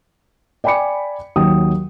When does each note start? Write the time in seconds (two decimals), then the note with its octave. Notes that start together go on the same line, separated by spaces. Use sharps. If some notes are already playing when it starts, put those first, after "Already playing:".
0.64 D5 G5 G#5 B5 D6 C#7
1.36 D#2 F#3 G5 D#6